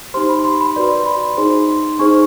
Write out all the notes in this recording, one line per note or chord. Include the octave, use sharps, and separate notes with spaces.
D#4 G4 C5 C6
B5
C6
B5
F#4 B4 D5 C6
B5
D#4 G#4 C5 C6
D#4 G#4 C5 C#6